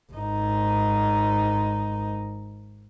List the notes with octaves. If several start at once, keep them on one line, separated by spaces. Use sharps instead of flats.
G#1 D#4